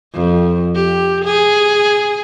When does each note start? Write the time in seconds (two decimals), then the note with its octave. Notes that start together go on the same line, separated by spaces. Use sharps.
0.14 F2
0.75 G4
1.25 G#4